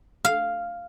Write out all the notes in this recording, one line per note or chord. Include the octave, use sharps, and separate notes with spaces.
F5